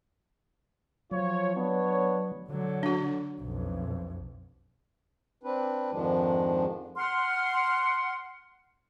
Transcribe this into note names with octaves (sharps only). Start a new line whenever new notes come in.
F3 F#3 F4 C#5
B3 D4 C#5
D3 F#3
D4 F#4
B1 F2
C4 D4 B4
F2 G#2 D#3 F3 G#3 D4
F#5 C6 F6